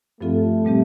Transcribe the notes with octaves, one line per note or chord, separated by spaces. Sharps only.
G2 F3 A3 C4 F4 A4
A#2 G3 C4 G4